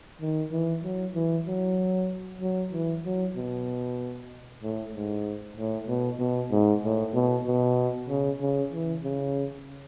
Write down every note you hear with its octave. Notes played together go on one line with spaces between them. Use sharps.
D#3
E3
F#3
E3
F#3
F#3
E3
F#3
B2
A2
G#2
A2
B2
B2
G#2
A2
B2
B2
C#3
C#3
E3
C#3